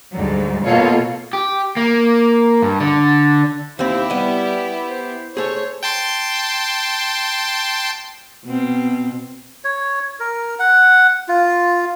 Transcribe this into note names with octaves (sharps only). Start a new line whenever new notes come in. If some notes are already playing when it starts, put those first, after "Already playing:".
D2 G#2 F#3 G3
B2 A#3 F4 A4 C#5
G4
A#3
G2
D3
D#2 C4 E4 G4 C5
G3 B3 D#5
C5
A3 G#4 C5 C#5
G5 A5 C6
B2 C4
C#5
A#4
F#5
F4